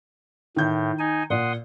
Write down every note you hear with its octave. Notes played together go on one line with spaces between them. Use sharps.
A2 D#3 G6
D#4 G#5
A#2 F#5 C6 D#6